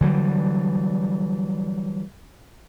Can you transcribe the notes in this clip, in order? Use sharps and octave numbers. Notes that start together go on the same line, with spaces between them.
D3 E3 F#3 G3